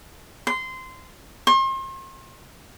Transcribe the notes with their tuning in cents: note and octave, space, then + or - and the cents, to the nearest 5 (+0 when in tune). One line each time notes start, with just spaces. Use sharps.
C6 -20
C6 +40